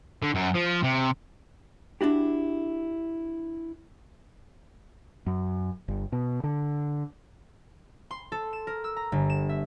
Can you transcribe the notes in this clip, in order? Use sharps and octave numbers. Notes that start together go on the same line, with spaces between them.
D3
F#2
F3
C3
D4 E4 F#4 G4
F#2
G1
B2
D3
C6
A4
E7
A#4
E6
A#5
G1
E7
E5